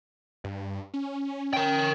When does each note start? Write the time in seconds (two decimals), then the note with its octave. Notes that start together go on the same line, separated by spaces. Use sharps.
0.44 G2
0.94 C#4
1.53 A#4 G5